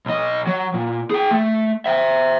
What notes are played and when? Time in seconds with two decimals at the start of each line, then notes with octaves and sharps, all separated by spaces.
0.06 B1 D#5
0.47 F#3
0.74 A#2
1.10 G#4 G5
1.31 A3
1.86 C5 E5